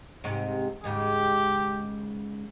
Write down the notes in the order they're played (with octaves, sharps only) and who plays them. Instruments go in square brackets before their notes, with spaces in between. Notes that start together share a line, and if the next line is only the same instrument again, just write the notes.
[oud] G#2 C3
[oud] D#2 G#2 C#3 [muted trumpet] G4